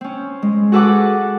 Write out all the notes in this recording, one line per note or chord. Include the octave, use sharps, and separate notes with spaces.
C4 C#4
G#3
F#4 G#4 A4 B4 F#5 D6